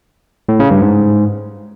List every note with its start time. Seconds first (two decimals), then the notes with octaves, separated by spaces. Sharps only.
0.49 A2
0.60 C#3
0.71 G2
0.82 G#2